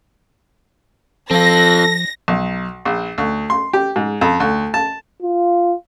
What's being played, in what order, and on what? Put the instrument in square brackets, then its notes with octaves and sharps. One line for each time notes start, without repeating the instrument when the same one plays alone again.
[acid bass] F3 [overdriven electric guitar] C4 F4 [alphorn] A4 [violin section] A#6
[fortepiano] B1
A#1
D2
C6
G4
G#2
F2
D2
A5
[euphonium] F4